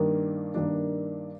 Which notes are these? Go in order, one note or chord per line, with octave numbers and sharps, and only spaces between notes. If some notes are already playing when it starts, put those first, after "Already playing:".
Already playing: G2 D#3 A#3 D4
G2 D#3 A#3 D4